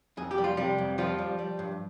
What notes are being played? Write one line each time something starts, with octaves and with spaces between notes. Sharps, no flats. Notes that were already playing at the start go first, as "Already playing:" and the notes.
F2 G#4
G4
G3
F4
C3 G3 G4
F2
F3 G3 F4
G3
G3
G2